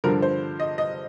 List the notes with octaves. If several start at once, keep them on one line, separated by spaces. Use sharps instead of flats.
G2 D3 F3 A#4
C5
D#5
D#5